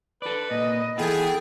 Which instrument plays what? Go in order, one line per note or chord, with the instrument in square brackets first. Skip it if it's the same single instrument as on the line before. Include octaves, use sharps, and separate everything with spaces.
[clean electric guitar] A4 D5 [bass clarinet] B4
[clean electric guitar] A#2 [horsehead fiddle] D#5
[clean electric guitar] E3 F4 [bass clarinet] B3 [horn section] G#4 [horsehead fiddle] A4 G5